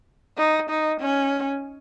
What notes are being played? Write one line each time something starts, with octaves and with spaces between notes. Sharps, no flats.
D#4
D#4
C#4